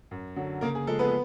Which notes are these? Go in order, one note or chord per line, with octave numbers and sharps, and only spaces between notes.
F#2
D3 F#3
C#3 A#3 A#4
G#4
F3 G#3 A4
B3 B4